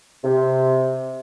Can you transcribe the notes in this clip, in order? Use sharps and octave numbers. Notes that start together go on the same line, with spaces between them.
C3